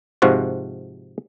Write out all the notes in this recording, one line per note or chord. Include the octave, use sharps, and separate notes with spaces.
G#2 C3 F3 F4 F#4